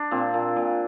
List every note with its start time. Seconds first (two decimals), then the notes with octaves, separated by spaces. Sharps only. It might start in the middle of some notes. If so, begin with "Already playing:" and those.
Already playing: D4
0.11 A#2 C4
0.34 A#2
0.56 A#2